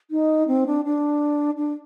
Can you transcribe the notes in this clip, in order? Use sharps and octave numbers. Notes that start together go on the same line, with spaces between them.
D#4
C4
D4
D4
D4